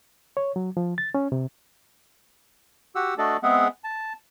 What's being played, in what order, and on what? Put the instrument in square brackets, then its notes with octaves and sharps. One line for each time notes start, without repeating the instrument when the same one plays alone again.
[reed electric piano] C#5
F#3
F3
A6
C#4
C3
[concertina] F#4 G4 F#5 E6
A3 D4 F#4 A4 D5 D#5
G#3 B3 C4 G#4 E5 F#5
A5